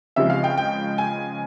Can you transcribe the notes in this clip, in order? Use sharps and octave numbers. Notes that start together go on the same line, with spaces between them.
C#2 C#3 F3 G#3 C4 E5
F5
G5
G5
G#5